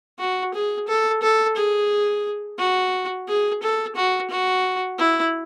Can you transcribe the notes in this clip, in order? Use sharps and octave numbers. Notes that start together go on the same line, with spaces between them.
F#4
G#4
A4
A4
G#4
F#4
G#4
A4
F#4
F#4
E4